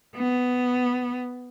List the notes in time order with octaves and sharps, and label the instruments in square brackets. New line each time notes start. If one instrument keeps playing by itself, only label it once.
[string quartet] B3